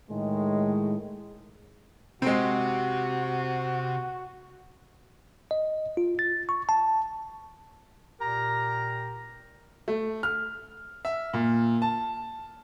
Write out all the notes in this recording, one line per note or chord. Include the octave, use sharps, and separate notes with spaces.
A2 D#3 G#3
C3 G#3 C4 F#4
D#5
F4
A6
C#6
A5
A#2 G4 A#4 A#5
A3
F6
E5
A#2
A5